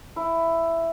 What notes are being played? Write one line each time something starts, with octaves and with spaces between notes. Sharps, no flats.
E4